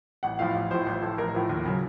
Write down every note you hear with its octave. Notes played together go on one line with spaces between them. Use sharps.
A1 F#5
A2 F3 F5
A1
A2 F3 C5
A1
A2 F3 A4
A1 A#4
A2 F3
D#2
C#3 F#3